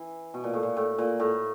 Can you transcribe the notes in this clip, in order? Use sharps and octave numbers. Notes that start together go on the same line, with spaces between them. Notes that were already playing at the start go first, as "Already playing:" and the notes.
Already playing: E3
B2
A#2
A2
A#2
A2
A#2
A2